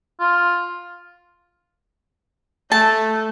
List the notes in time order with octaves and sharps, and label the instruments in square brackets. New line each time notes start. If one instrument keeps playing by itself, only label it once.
[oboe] F4
[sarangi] A3 [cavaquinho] A5